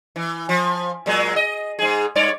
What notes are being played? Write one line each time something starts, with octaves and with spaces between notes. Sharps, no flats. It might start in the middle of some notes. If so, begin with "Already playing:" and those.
E3
F3
A#2 F#3 G#3
D#5
G#2 G#4
G2 C#5 D5